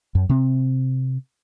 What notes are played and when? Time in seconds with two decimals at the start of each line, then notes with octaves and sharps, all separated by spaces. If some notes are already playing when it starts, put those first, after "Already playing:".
0.15 F#2
0.29 C3 C4